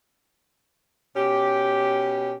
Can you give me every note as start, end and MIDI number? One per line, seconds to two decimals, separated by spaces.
1.16 2.33 47
1.16 2.33 61
1.16 2.33 67